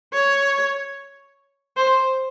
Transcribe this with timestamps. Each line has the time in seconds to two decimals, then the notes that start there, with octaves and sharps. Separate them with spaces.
0.13 C#5
1.77 C5